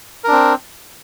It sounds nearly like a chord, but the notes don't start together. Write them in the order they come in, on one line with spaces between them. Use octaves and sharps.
A#4 D4 C4